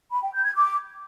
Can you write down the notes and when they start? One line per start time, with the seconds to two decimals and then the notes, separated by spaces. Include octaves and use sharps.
0.12 B5
0.23 G5
0.34 G6
0.44 G#6
0.55 D6